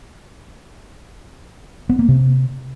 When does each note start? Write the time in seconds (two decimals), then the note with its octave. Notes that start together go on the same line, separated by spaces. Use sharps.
1.89 B3
1.99 A#3
2.08 C3